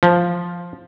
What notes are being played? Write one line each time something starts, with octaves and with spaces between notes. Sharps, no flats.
F3